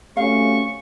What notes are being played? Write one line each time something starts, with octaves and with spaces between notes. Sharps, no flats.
C3 F#3 A3 C#4 F5 C#6